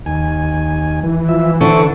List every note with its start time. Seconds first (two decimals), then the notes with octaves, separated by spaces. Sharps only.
0.06 D#2 G#5
1.03 E3
1.29 F3 E5
1.61 D3 C5 E5 C#6